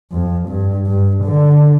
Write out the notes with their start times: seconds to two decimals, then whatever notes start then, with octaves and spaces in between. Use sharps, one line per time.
0.12 F2
0.48 G2
0.87 G2
1.23 D3